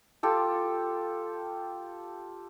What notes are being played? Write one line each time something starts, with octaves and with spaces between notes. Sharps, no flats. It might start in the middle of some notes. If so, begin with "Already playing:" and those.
F4 G4 A4